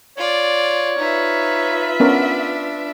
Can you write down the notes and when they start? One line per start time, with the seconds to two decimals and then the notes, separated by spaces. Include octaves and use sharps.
0.17 F4 C#5 D5
0.98 D#4 F4 B4 E5
2.00 B3 C#4 D4 A#4